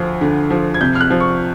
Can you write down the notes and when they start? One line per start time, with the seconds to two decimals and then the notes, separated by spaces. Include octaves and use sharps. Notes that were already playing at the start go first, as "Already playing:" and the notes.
Already playing: D2 F3
0.21 D3
0.51 F3
0.74 G#6
0.81 C3 G6
0.95 F6
1.01 F#6
1.11 F3
1.20 C#6